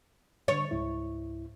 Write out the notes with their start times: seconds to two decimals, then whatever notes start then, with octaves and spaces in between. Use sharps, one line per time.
0.48 D3 C#5 A6
0.71 C#2 G#2 E4